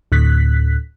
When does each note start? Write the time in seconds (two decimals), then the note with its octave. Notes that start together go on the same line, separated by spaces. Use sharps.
0.12 D2 A2 F#6 B6